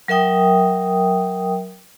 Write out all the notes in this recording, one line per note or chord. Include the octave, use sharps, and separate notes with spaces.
F#3 A#4 E5 G5 D#6